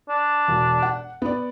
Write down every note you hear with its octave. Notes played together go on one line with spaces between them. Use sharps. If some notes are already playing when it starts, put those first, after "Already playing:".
D4
E1
F#5
B3 D5